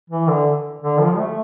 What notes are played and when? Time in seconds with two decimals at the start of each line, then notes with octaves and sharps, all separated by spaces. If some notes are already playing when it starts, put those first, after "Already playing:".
0.10 E3
0.28 D3
0.82 D3
1.00 F3
1.18 A3